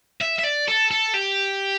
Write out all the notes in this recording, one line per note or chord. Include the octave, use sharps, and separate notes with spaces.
E5
E5
D5
A4
A4
G4